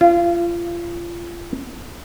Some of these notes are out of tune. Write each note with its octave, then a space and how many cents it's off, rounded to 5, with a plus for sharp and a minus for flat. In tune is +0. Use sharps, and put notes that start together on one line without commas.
F4 -30